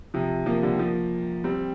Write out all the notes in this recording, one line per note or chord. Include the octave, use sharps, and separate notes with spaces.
C3 F3
F3 A#3
D3 G3
F3 A#3
G3 C4